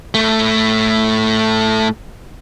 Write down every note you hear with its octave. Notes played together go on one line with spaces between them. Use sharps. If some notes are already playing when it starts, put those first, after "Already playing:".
A2 A3